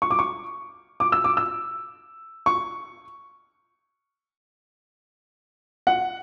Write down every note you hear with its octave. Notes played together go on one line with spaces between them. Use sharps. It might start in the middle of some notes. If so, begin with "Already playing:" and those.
C#6
D6
C#6
D6
E6
D6
E6
C#6
F#5